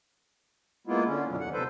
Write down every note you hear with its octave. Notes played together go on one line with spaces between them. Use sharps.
G#3 A#3 B3 E4 F4
D3 C#4
F#2 B2 D3 F#3
D#2 F#5
C3 A4 B4 C5